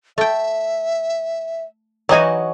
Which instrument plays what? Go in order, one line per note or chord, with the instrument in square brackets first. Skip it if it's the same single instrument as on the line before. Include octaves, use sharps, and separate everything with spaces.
[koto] A3 G5 [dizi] E5
[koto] E3 D#4 F#4 [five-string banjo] F#3 D#5 G#5